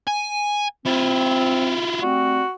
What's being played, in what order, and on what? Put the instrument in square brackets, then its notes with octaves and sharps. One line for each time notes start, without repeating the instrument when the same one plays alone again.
[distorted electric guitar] G#5
[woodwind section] C4 [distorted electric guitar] E4 F4
[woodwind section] G3 A3 C4 [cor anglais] F#4